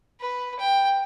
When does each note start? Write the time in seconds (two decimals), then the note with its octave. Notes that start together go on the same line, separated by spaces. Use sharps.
0.20 B4
0.59 G5